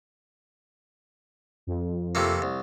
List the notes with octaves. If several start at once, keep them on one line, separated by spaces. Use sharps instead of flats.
F2
C3 A3 A#3
C2